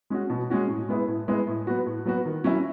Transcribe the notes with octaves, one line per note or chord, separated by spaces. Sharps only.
G#3 C#4 F#4
B2
G#3 C#4 F#4
A2
G#3 B3 E4
A2
G#3 B3 E4
A2
F#3 B3 F#4
A2
F#3 B3 F#4
D#3
F#3 C#4 E4